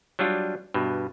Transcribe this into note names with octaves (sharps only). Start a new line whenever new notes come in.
F#3 G3 D4 F4
G2 B2